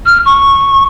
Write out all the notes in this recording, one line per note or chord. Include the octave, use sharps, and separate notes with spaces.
F6
C#6